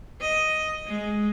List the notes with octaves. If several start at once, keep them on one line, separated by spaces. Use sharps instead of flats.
D#5
G#3